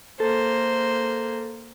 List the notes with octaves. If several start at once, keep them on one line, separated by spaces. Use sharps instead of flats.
A#3 A4 C5